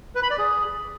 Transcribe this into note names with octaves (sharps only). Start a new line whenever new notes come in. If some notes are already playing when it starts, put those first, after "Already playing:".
B4
B5
D5
G#4